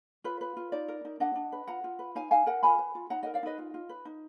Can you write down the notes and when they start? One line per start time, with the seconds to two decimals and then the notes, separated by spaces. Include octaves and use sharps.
0.24 F4 B4
0.41 B4
0.57 F4
0.72 D#4 D5
0.88 A#4
1.05 D#4
1.20 D4 D#5 F#5
1.35 D4
1.52 B4
1.67 F4 F#5 A#5
1.84 F4
1.99 B4
2.15 D#4 F5 G#5
2.31 D#4 F5 G#5
2.46 A#4 F#5 A#5
2.63 F4 G#5 B5
2.78 B4
2.95 F4
3.10 D#4 F#5 A#5
3.23 A#4 D#5 F#5
3.34 D5 F5
3.43 D#4 B4 D#5
3.58 F4
3.74 F4
3.89 B4
4.05 D#4